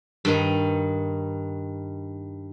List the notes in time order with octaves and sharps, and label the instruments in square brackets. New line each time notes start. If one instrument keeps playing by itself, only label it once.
[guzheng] G2 D#3 D#4